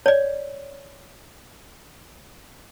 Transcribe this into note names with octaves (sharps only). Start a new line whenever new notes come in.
C#5 D5